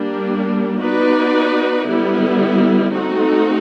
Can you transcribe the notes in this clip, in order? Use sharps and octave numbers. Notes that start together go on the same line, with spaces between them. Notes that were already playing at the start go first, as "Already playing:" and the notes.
Already playing: G3 A#3 D4
B3 D#4 F#4 B4 D5
D3 G3 B3 E4
A3 C4 D#4 F#4 A4